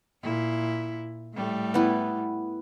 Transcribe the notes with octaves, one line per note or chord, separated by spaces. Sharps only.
A#2 E4
A2 G3 A3
B3 E4